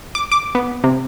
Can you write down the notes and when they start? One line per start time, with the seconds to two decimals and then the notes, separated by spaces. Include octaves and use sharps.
0.15 D6
0.32 D6
0.55 B3
0.84 C3